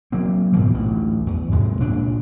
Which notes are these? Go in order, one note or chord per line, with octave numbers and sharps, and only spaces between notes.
F#3 A#3 C4
G#2 B2 E3 F3
A1 D2
E2
G#2 C3 G#3
C#2 A#2 D4